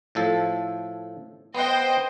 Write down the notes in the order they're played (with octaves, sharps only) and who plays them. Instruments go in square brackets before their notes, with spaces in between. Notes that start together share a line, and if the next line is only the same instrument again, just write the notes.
[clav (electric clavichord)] A2 F3 A4
[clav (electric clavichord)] B3 F#5 [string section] C5 D#5 G5